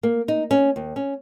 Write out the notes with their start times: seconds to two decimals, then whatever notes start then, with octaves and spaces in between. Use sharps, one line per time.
0.03 A#3
0.28 D#4
0.51 C#4
0.76 D#2
0.96 C#4